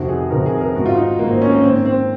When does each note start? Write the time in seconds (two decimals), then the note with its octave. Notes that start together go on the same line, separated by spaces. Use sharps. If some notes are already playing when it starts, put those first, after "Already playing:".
Already playing: F2 C3 D#3 F#4
0.09 G#4
0.31 F2 C3 D#3 A#4
0.46 G#4
0.61 A#4
0.75 G#2 D#3 F#4
0.86 F4
0.97 D#4
1.19 G#2 D#3 A#3
1.30 C4
1.41 C#4
1.52 A#3
1.63 G#2 D#3 C4
1.85 C4